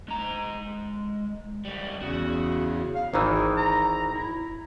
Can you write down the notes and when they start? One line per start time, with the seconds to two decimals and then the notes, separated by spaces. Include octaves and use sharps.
0.08 G#3 A#5
1.65 C#2 G3
2.02 E2 C#3 F#4
2.95 F5
3.14 G#1 D#3 E3 D#4
3.57 A#5
4.14 E4